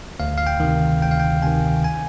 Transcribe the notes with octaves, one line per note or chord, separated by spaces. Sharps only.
D2 F5
F5
G5
C3 D#3
D2 G5
F5
G5
C3 D#3 G#5
G#5